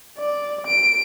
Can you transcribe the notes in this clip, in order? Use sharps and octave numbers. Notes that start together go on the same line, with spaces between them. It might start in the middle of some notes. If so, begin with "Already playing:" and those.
D5
D7